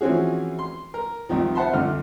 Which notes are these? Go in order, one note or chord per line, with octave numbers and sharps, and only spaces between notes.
E3 F3 C4 C#4 F#4 G#4
C6
A#4
C2 C3 D#3 F3
C5 E5 F#5 A5 B5 C6
C2 F2 D3 F6